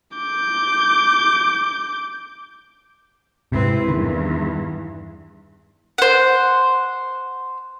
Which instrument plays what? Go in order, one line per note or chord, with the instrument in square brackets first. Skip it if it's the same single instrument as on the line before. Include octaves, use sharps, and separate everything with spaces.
[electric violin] D6 G6
[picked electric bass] G#2 C3 [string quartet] C4 E4 B4
[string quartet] E2 G2 [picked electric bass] D#3
[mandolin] C5 F#5